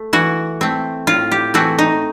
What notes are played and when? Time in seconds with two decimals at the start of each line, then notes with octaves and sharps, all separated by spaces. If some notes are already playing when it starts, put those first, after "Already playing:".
Already playing: A3
0.13 E3 F#4
0.61 A3 C4
1.07 A2 F4
1.32 G4
1.54 E3 A3 C4 F#4
1.79 D#4